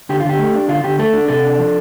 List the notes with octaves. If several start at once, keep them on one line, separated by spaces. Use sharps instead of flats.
D3 G4
F4
D3 G4
A3
D4
D3 F4
D3 G4
A3 A4
D4
C3 A4
D4
F3